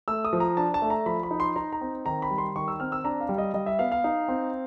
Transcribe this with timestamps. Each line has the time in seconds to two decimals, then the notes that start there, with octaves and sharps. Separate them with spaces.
0.08 A3 E6
0.25 D#6
0.33 F3
0.40 A#5
0.57 D4 A5
0.74 A5
0.82 A3
0.90 A#5
1.06 F3 B5
1.23 B5
1.31 D#4
1.40 C6
1.56 D#4 A#5
1.73 A#5
1.81 C4
2.06 D#3 A#5
2.22 B5
2.31 G3
2.38 C6
2.56 D#3 C#6
2.68 E6
2.80 C4 F6
2.92 E6
3.04 D4 A#5
3.21 F5
3.29 G3
3.38 D#5
3.54 G3 D#5
3.66 E5
3.79 B3 F5
3.92 F5
4.04 D#4
4.28 C4